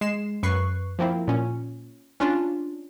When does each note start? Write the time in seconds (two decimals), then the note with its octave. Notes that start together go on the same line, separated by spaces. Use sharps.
0.01 G#3 C7 E7
0.43 F#2 B4 C#6 F#6 C7
0.99 F3 A#3 C4 E4
1.28 A#2 C#4
2.20 C#4 D4 F4